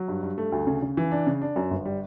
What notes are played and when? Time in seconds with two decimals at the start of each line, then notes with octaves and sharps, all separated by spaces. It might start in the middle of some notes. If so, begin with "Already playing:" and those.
Already playing: F#3
0.08 G2
0.23 G2
0.38 A3
0.52 D2
0.67 C#3
0.82 C#3
0.97 E3
1.11 D4
1.27 C#3
1.42 D4
1.56 F#2
1.71 G1
1.85 G3